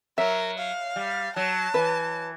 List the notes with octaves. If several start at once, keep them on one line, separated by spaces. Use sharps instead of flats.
F#3 A#4 E5
F5
G3
F#3 A5
E3 B4